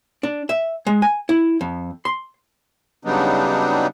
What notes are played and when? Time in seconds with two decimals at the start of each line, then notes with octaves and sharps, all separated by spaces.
0.23 D4
0.49 E5
0.87 G#3
1.02 G#5
1.29 E4
1.61 F2
2.05 C6
3.05 C#3 F#3 G3 B3 D4 D#4